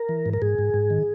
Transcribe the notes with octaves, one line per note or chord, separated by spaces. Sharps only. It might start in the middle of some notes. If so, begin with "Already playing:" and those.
Already playing: A#4
E3
G#2
A#4
G#2 G#4
G#2
G#2
D#3